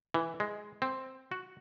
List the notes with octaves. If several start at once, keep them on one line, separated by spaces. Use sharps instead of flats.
E3
G#3
C4
F#4